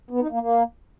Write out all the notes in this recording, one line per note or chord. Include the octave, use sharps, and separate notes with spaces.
B3
D#4
A#3
A#3